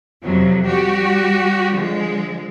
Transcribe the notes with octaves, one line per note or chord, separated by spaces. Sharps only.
F2 C3 F3 F#3
G3 F#4 G4
D3 F3 G#3